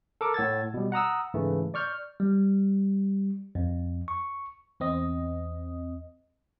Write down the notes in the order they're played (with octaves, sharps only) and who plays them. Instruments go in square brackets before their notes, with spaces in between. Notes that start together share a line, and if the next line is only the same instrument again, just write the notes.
[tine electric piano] A4 A#4 D6
A2 F#5 E6 G#6 A6
B2 G3
F#5 A#5 D#6 E6
G#2 C#3 E3 A3
D5 C#6 F6 G6
G3
F2
C#6
[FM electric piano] E2 C4 D#5